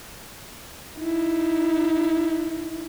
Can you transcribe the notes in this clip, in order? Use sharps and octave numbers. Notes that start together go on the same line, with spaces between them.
D#4 E4